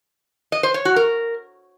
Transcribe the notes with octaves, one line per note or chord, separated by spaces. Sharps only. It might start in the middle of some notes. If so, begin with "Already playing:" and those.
D#5
C5
C#5
F#4
A#4